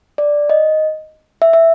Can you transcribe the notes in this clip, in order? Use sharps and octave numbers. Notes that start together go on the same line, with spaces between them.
D5
D#5
E5
E5